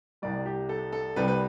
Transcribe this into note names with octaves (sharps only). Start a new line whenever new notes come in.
C2 C3 G3 D5
G4
A4
A4
C2 C3 G3 B4
B4